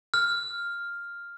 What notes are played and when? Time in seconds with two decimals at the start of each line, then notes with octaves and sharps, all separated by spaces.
0.14 F6